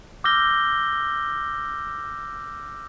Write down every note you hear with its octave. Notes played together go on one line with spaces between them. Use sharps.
D6 E6 F6 G6 A#6 G7